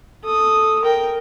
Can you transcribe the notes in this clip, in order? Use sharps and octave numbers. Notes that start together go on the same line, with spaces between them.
A4 D#6
A#4 G5